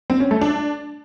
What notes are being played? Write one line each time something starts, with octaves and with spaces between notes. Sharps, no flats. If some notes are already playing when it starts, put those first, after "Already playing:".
C4
C#4
A3
D4